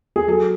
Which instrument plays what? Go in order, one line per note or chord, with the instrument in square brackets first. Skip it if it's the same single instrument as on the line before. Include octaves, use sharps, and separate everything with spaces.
[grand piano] G#4
F#3 A4